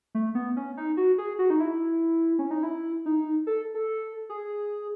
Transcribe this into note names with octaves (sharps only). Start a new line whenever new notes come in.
A3
B3
C#4
D#4
F#4
G#4
F#4
D#4
E4
C#4
D#4
E4
D#4
A4
A4
G#4